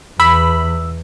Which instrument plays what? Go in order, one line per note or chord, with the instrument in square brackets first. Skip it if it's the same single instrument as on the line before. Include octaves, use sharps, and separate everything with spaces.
[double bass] E2 [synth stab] B5 [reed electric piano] E6